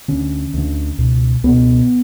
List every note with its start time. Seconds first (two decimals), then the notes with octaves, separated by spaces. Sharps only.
0.08 D2 D3 C#4
0.54 D2 D3
0.98 C#2 B2
1.44 C#2 B2 B3